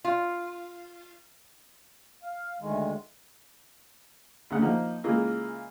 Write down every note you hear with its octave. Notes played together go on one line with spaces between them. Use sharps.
F4
F5
D2 D#3 G#3
D2 C#3 A#3 F#5
F3 A#3 D#4
C#3 E3 G#3 A#3 F4 A#4